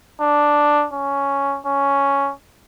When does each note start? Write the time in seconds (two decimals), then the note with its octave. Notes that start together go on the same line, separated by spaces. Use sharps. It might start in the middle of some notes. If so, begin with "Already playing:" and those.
0.21 D4
0.93 C#4
1.66 C#4